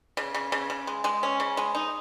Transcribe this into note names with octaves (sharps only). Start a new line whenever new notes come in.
C#3
C#3
C#3
C#3
G#3
G#3
C#4
C#3
G#3
D#4